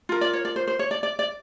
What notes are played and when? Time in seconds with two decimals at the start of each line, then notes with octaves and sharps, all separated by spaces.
0.09 F4 A#4
0.21 D5
0.33 C#5
0.45 D5
0.56 C5
0.67 C5
0.79 C#5
0.91 D5
1.03 D5
1.19 D5